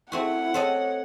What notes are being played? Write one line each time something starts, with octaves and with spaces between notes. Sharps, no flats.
A3 C4 E4 F#4 F#5
C4 A4 C#5 D#5